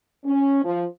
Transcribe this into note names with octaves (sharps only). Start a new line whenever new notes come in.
C#4
F3